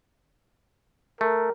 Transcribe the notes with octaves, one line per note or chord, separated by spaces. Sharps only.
A3 A#4